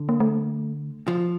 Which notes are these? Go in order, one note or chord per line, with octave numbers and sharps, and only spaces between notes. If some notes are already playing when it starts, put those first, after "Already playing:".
Already playing: D3
A#3
A3
F3